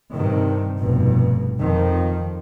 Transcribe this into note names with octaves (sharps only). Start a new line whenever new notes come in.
G2 C3 D#3
F1 G2 B2
F2 D#3 F3